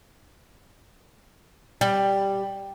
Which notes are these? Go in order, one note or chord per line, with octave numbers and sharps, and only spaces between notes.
G3